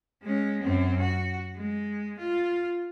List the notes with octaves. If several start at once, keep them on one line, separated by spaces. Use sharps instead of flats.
G#3 C#4
F#2 C4
F#4
G#3
F4